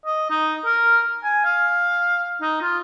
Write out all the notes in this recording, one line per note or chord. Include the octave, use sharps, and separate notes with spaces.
D#5
D#4
A#4
G#5
F5
D#4
F4